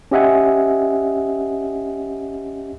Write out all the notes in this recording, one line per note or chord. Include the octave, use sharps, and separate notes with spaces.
C#4 G4 D#5 E5 F#5 G#5